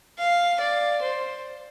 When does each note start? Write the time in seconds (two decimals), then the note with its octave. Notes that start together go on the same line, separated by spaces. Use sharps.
0.18 F5
0.60 D5
1.02 C5